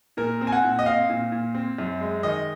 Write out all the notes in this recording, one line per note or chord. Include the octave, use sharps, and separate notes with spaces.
A#2 A#4
C4
G#5
F#5
A#2
D#5
C4 F5
A#2
A#2
C4
F#2
G#3
D#3 D#5